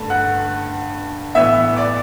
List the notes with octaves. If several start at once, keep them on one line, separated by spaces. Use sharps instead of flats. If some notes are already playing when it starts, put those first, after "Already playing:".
Already playing: G2 D3 A3
F#5 F#6
A2 E3 B3 E5 E6
D5 D6